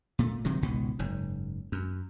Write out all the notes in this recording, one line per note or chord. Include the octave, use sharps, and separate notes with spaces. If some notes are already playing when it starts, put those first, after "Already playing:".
A#2 A3
G1 C3 D#3 F#3
G#1 C#2 B2 D#3
F#1 G#2
F#2